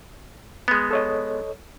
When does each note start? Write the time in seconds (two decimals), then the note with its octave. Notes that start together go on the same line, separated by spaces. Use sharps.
0.68 G#3 B3
0.91 A4 C#5 D#5